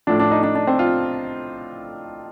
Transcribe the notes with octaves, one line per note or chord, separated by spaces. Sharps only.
A2 F3 D4
D4
D#4
D4
D4
C4
F4